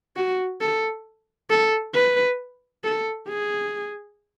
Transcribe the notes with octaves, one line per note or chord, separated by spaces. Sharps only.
F#4
A4
A4
B4
A4
G#4